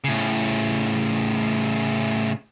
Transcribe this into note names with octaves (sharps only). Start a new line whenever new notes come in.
A2 C#3